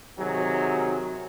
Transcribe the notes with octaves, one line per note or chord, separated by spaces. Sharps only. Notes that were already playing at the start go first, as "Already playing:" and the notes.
C3 D#3 F#3 G#4